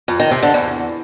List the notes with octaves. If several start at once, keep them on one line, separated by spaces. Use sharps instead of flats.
F2
D#3
C3
D3
E2